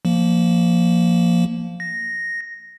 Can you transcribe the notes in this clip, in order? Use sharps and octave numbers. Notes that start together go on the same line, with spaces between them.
F3 A#3
A#6